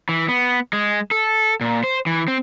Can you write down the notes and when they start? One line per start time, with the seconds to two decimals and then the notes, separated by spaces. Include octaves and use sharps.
0.09 E3
0.28 B3
0.73 G#3
1.11 A4
1.61 A#2
1.84 C5
2.06 E3
2.28 C4